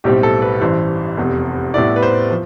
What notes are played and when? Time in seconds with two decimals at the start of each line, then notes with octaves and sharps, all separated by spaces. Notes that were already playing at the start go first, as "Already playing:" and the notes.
0.04 B1 A2 G3 C4 G4
0.23 A4
0.42 B4
0.61 A1 G2 E3 C5
1.17 F1 E2 C3
1.74 A2 G3 B3 E4 D5
1.96 B4
2.03 C5
2.30 F3